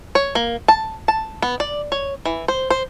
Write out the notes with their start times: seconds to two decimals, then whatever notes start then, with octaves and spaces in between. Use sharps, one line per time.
0.15 C#5
0.35 A#3
0.68 A5
1.08 A5
1.42 B3
1.60 D5
1.92 C#5
2.25 E3
2.48 C5
2.70 C5